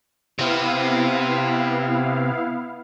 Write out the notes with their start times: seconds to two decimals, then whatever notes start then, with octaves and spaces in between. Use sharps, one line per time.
0.39 C3 B3 C4 E4 F5